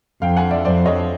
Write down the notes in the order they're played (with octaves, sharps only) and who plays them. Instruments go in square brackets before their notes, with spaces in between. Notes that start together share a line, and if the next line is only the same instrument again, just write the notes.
[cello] F2 [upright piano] F5 G5
[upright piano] F#5 G#5
D5 E5
[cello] F2 [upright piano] C5 D5
[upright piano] C#5 D#5